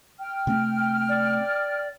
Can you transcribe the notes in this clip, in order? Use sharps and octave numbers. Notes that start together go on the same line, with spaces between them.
G5 F6
C3 A3 C4
D5